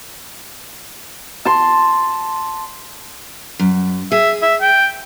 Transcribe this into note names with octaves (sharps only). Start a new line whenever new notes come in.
A5 C6
F#2
G#4 E5
E5
G5